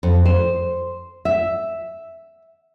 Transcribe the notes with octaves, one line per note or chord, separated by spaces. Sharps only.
F2
C5
E5